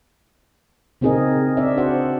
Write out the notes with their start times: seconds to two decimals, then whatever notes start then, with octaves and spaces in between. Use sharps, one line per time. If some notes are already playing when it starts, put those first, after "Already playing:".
1.01 C#3 C4 D#4 G#4 A#4 D#5
1.57 C4 D4 D5 E5
1.77 F#4 C5 D5 F#5